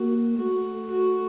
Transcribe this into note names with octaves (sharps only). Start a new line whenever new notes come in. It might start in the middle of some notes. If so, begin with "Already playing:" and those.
Already playing: A#3 F#4
A3 F#4
F#4